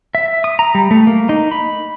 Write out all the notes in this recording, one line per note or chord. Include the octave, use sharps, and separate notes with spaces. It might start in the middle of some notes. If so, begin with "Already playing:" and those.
E5
D#6
A#5
G3
A3
A#3
D#4
B5